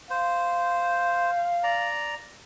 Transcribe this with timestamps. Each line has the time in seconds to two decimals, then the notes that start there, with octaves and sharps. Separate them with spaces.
0.10 C5 F5
1.63 D5 A#5